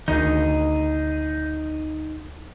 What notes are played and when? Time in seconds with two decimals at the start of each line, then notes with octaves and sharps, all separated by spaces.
0.08 D2 D#3 D#4 G#4